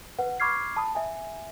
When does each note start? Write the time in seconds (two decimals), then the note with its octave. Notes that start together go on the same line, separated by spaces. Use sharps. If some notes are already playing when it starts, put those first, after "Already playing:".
0.19 B4 F#5
0.40 B5 C#6 D6 F6 G#6 C7
0.76 A5 B5 D#6
0.95 E5 G#5